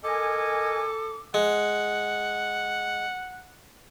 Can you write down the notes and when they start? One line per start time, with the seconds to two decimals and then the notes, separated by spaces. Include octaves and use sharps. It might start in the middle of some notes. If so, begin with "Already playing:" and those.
0.04 A4 A#4 D#5 G#5 D6
1.34 G#3 F#5